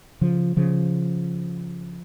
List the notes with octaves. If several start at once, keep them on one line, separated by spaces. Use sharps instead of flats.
C#3 F3
C#3 F3